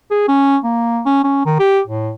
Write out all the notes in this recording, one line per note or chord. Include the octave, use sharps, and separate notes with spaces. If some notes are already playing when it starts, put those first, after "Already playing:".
G#4
C#4
A#3
C#4
C#4
D#3
G4
A2